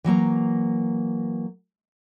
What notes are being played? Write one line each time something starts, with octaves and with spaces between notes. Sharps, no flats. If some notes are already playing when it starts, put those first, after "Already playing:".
E3 F#3 A#3 A#5